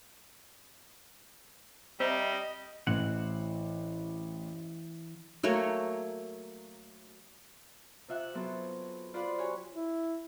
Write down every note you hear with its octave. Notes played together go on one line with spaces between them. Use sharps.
G3 C4 D#5 E5 A#5
A1 E3 C4 F#5
F#3 A3 A#3 C#5
C3 F4 E5 F#5 F#6
F#3 B3 C4 F4 A4 C5
F4 C5 D5 F#5 B5
F#4 G4 C#5 G#5
E4